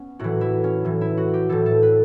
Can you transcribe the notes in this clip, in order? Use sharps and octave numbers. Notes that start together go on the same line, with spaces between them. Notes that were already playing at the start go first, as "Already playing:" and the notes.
Already playing: B3 C#4
A2 E3 F#4
E4
C#4
A2 E3
E4
F#4
G4
A2 E3 A4
A4
B4